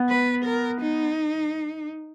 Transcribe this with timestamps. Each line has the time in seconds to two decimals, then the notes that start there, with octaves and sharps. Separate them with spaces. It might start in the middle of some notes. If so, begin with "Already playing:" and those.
Already playing: B3
0.09 B4
0.45 A#4
0.81 D#4